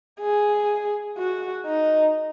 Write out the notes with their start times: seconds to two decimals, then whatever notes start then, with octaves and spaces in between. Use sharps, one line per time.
0.21 G#4
1.18 F#4
1.66 D#4